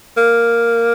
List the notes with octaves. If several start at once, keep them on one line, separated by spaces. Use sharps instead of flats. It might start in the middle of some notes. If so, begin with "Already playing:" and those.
A#3